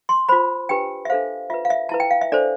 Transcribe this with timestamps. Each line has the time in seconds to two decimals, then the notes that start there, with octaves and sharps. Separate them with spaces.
0.09 C6
0.29 F4 C5 B5
0.69 D4 G4 B4 G5
1.05 E5
1.10 D4 A4 C5 F5
1.50 F4 B4 E5
1.65 F5
1.70 E5
1.89 E4 B4 A5
2.00 G5
2.11 F5
2.21 E5
2.32 D4 A4 C5 D5